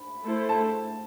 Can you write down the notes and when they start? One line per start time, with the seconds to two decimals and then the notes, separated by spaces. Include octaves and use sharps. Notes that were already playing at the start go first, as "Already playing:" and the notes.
Already playing: B5
0.25 A3 E4 A4 C5
0.49 A5